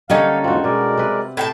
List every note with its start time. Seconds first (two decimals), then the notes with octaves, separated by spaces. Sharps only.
0.10 D3 G3 A#3 C#4 D#4 A4 F5
0.44 E2 G#2 C4 F4 F#4
0.64 B2 G#3 A#4 D5
0.97 C3 B4
1.37 A2 G5 A5